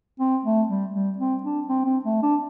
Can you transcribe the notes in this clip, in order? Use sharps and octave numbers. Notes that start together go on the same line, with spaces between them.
C4
A3
G3
G3
C4
D4
C4
C4
A3
D4